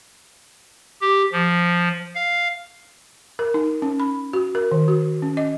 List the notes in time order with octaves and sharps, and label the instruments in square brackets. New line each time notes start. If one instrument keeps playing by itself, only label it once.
[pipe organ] G4
F3
F5
[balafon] A#4
D#4
C#4
B5
F#4
A#4
D#3
F#4
C#4
D#5